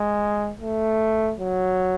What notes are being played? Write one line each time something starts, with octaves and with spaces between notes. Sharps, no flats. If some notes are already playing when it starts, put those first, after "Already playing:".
Already playing: G#3
A3
F#3